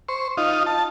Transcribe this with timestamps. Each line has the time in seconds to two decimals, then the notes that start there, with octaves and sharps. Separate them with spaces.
0.09 C5 C#6
0.37 D#4 F4
0.66 A5